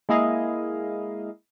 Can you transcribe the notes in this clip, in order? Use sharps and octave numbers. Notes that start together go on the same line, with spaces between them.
G#3 A#3 E4 G#4 D#5 F5